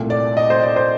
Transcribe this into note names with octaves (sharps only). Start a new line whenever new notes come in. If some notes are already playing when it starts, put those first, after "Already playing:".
Already playing: C2 A#2 A3
D5
D#5
C5
D5
C5